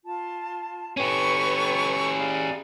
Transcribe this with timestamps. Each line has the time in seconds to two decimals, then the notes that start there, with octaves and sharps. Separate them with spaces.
0.05 F4 A5
0.97 C#4 G4 A4 B4 C#6
2.18 G#4 D5 F5